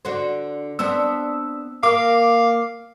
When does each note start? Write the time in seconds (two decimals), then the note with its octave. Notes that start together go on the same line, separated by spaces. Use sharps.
0.05 D3 F#4 C5
0.79 B3 C4 D4 E6
1.83 A#3 F5 D6